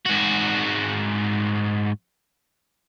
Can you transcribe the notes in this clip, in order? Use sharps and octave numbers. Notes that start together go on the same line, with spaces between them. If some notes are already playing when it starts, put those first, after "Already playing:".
G#2 F#4